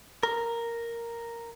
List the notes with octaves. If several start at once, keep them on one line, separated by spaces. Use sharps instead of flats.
A#4